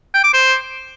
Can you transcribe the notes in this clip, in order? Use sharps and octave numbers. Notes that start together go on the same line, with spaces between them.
G5
D6
C5